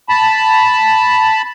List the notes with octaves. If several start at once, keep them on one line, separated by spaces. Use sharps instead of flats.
A5 B5